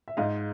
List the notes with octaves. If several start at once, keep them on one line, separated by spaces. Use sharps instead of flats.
E5
G#2 D#5 F5